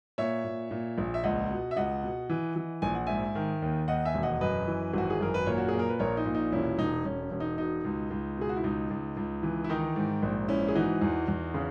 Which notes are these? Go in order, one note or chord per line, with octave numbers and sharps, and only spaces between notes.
A#2 C#5 E5
A#2
A#2
A#1
E5
C#2 D#5 F#5
B2
E5
C#2 D#5 F#5
B2
E3
E3
A#1 G#5
F#5
G#2 E5 G#5
D#3
D#2
D#2 D#5 F#5
E5 G#5
E1
D#5 F#5
F#2 B4 D#5
E3
G#1 F#4
G#4
F#2 A#4
B4
A#2 A#4 C#5
F#4
A#2 G#4
A#4
B4
A#1 A#4 C#5
D#4
A#2
D#4
E1 C#4 E4
E1 D#4
E1 C#4
C#4
E1
D#4
B2 D#4
C#2
C#2
B2 G#4
F#4
E4
C#2 D#4
C#2
C#2
E3
E4
D#3 D#4
G#2
A#1
G#2 C#4 E4
G#4
E3 D#4 F#4
E2
E2
C#3